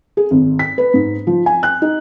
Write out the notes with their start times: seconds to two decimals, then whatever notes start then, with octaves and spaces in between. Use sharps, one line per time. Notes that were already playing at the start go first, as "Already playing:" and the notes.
0.17 G#4
0.31 G#1
0.59 B6
0.78 B4
0.94 G#2
1.27 F3
1.46 G#5
1.63 F#6
1.82 D#4